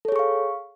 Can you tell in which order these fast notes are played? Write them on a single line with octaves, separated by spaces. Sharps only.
A4 C#5 G#4 C#6 F5